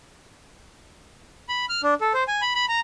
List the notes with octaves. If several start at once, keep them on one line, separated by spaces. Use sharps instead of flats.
B5
F6
D4
A4
C5
G#5
B5
B5
A#5